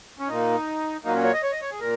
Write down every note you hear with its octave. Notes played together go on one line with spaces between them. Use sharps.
C#4
A#2 A#3 D#4
A#2 F#3 A#3 D#4
C#4
C#5
D#5
C#5
D#5
C#5
G#4
A#2 A#4